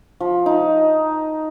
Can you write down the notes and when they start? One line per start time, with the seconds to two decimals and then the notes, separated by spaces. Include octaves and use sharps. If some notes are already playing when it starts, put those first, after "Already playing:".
0.20 F3
0.46 D#4